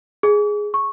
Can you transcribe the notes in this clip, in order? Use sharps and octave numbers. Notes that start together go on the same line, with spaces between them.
G#4
C#6